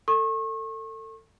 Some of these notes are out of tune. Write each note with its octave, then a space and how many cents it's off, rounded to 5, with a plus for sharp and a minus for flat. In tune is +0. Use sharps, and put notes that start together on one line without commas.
A4 +30 C#6 -35